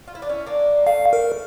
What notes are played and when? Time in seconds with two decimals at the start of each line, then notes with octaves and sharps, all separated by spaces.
0.08 F4
0.15 E4
0.22 D4
0.29 C#4 E4
0.47 A#3 D4
0.86 A3 C#4 F5
1.13 A#4